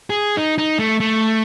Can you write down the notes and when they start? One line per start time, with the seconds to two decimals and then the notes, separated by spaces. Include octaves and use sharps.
0.10 G#4
0.37 D#4
0.58 D#4
0.79 A3
1.00 A3